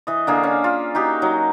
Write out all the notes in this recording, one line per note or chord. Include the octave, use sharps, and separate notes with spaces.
E3 D#5
D3 A#3 G#4
C#4
F4
D#4 F#4 G4
F#3 D#4